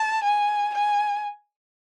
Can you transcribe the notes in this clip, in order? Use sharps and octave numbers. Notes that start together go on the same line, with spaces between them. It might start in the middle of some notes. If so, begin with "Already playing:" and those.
Already playing: A5
G#5
G#5